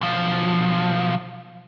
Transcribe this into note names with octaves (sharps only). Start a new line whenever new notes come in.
B1 F3